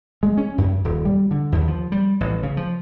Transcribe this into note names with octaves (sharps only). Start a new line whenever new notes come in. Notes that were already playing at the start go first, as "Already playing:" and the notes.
G#3
C#4
F#2
D#1
G3
D3
D#2
F3
G3
A1
C#3
F3